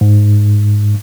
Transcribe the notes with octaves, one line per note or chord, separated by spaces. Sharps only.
G#2